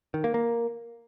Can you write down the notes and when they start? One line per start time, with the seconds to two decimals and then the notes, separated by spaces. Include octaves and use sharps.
0.14 D#3
0.24 A#3
0.34 A#3